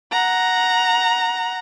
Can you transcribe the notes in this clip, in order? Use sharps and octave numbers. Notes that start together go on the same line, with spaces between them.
F#5 A#5